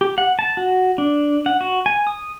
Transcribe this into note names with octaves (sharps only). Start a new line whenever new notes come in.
G4
F#5
A5
F#4
D4
F#5
F#4
G#5
D#6